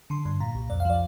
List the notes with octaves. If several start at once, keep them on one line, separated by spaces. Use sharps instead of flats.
D3 C6
G2 C6
A#2 A#5
C2
F2 D5
F5
F3 D5